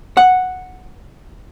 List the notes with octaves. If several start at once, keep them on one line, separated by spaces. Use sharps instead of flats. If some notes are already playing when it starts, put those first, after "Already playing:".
F#5